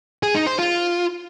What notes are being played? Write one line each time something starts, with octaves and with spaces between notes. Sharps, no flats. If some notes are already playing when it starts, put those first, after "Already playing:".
G#4
D#4
C5
F4